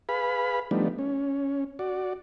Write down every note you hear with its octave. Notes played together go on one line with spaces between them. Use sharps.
G#4 B4 F5 B5
F3 G3 A3 B3 D4 D#4
C#4
F#4 D5